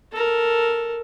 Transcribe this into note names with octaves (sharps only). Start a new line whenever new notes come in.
A4 A#4